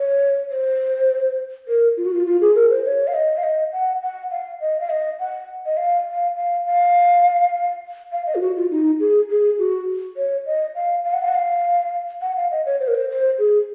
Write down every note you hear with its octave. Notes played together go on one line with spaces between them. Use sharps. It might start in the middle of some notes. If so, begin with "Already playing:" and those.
Already playing: C#5
C5
A#4
F4
F#4
F4
F4
G#4
A#4
C5
C#5
F5
D#5
F5
D#5
F#5
F#5
F5
D#5
F5
D#5
F#5
D#5
F5
F5
F5
F5
F5
D#5
F4
F#4
F4
D#4
G#4
G#4
F#4
C#5
D#5
F5
F5
F#5
F5
F#5
F5
F#5
F5
D#5
C#5
C5
A#4
C5
C5
G#4